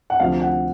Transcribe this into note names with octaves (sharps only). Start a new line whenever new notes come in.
F#5
D2 C3 F3 A3 F5
F#5